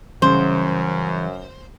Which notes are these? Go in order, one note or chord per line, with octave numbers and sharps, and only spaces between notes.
F#2 C#3 E3 G3 C5